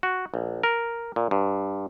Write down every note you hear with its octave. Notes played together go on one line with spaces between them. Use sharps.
F#4
A#1
A#4
A#2
G2